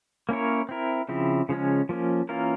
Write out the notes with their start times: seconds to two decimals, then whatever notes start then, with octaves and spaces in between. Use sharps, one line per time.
0.29 A#3 C#4 E4 A#4 C#5
0.69 C4 E4 A#4
1.09 C#3 F3 C4 E4
1.49 C#3 F3 G#3 C#4
1.89 F3 A#3 C#4
2.29 E3 A#3 C#4 F4 A#4